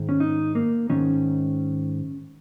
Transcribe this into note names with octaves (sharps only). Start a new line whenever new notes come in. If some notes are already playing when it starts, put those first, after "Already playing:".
Already playing: G#2 D#3
C#4
D#4
A#3
G#2 D#3 C#4